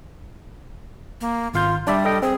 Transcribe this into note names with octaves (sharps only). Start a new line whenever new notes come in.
A#3
G#1 F4 F5 G6
G3 D4 D5 E5
A4 D#5 G5
C4 G#4